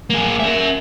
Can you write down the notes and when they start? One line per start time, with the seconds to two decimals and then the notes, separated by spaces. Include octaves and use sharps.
0.10 A#3 G#4
0.40 A#4 E5